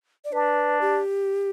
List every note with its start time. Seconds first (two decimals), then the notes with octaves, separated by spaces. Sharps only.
0.25 D5
0.33 D4 B4
0.81 G4